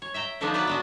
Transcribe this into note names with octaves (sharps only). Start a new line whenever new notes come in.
C#5
E5 G5 A#5
D3 F3 A3 B3 D4 D#4
F#3 B3 B4 D5 F#5
B3 D4 F#4